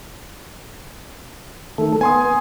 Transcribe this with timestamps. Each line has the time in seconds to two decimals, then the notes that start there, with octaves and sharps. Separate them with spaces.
1.78 D#3 A3 A4
2.01 B3 G#5 C6 D#6